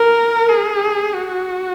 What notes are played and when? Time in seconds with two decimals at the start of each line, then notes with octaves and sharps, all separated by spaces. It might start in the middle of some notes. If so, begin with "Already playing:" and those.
Already playing: A#4
0.49 G#4
1.15 F#4